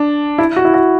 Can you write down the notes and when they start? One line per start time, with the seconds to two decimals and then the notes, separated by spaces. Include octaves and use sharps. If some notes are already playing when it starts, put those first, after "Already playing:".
Already playing: D4
0.38 E4
0.56 F#4
0.65 E4
0.74 F#4